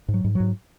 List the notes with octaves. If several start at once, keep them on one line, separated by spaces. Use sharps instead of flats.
G#2
F#3
G#2
G#2 F#3